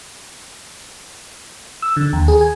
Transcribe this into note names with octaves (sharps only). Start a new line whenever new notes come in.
E6
D3
D#2
G#4
G#5